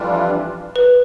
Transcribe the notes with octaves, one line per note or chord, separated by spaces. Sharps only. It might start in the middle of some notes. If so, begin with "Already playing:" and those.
Already playing: F2 E3 G3 D4 F4
B4